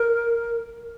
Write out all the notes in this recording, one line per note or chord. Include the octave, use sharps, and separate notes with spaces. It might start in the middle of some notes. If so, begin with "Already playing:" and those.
Already playing: A#4